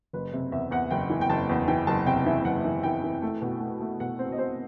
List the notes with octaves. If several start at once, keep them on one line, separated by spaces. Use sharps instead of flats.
F#1 B4
C3
E2 E5
E2 F#5
F#1 G5
E3
G5
F#1 A5
E2
E3 G5
F#1 A5
C3 G5
E3 E5
F#1 F#5
E3
E3 G5
E3
A3
B2
A3
A3
B2 F#5
C4
D#5
C4 C5